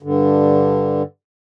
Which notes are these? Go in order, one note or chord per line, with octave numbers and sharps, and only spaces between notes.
G2 D3